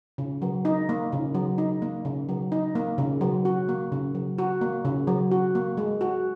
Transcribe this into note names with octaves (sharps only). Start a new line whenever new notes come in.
C#3
F#3
D#4
A#3
C#3
F#3
D#4
A#3
C#3
F#3
D#4
A#3
C#3
F#3
F#4
A#3
C#3
F#3
F#4
A#3
C#3
F#3
F#4
A#3
G#3
F#4